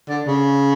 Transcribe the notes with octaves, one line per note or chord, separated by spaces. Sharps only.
D3
C#3